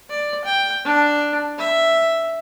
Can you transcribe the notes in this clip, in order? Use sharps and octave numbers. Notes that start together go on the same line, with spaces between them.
D5
G5
D4
E5